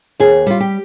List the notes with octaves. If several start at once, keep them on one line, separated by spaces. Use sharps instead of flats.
D#2 G#4
G3 F4
G4